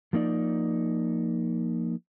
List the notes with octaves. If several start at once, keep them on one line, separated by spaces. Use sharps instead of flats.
F3 A#3 D#4 D5